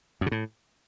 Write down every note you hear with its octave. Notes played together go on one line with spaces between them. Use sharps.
F#2
C#3
A2